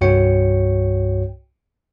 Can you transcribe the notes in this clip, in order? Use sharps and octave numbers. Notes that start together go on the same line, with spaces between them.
C2 G2 F#4 C#5 G5 C#7